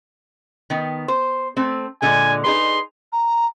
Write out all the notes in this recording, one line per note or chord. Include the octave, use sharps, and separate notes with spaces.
D#3 B3
C5
A3 C4
A#2 D3 G#3 G#5
D#4 G#4 B4 C6
A#5